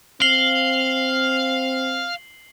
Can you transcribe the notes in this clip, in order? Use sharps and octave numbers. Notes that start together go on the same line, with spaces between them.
C4 F5 C7 F#7 G7